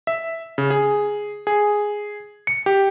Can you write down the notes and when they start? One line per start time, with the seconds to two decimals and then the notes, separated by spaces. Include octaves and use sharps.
0.07 E5
0.58 C#3
0.70 G#4
1.47 G#4
2.47 C#7
2.66 G4